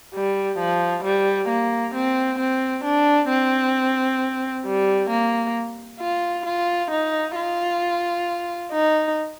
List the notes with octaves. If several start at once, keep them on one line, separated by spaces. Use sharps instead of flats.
G3
F3
G3
A#3
C4
C4
D4
C4
G3
A#3
F4
F4
D#4
F4
D#4